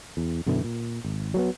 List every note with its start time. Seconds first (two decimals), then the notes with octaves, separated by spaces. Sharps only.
0.17 E2
0.46 F#2 B2 D3 E3
0.64 A#2
1.04 G#1
1.34 F#3 A3 B3